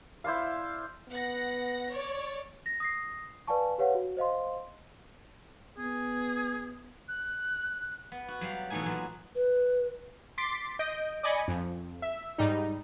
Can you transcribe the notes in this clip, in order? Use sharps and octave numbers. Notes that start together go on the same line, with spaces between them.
E4 C5 D5 F5
B3 F#5 A#6
C#5 D5
A#6
D#6 A#6 C7
B4 D5 F5 G#5 A5 C#6
G4 B4 C#5 F5 F#5
F#4
C5 D#5 F5 C6
B3 G#4
F#6
B3
F#4
F#3 G3 F5
B2 E3 F#3 A3 D#4 G#5
A#2 F#3
B4
C6 D6 A6 B6 C7
D#5 G6 D7
D5 D#5 G#5 B5 C#7
F2
E5
G#2 G3 D#4